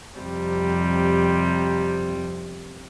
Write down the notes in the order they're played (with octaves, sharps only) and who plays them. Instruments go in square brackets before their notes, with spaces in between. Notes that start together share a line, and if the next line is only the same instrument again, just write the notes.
[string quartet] F2 C3 G3